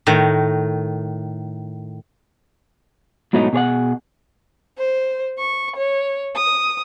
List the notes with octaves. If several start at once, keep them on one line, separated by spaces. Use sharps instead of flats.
A2 D#3
G#2 B2 F#3 A3 D#4 E4
B2 G#4 C#5 F#5
C5
C#6
C#5
D#6